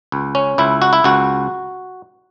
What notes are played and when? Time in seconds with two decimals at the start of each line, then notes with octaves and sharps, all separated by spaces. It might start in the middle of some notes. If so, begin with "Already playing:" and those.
0.12 C#2
0.35 C#4
0.58 C#2 E4
0.82 F#4
0.93 E4
1.04 C#2 F#4